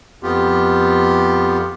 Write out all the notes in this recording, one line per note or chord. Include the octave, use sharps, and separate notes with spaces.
F2 B3 F4 G4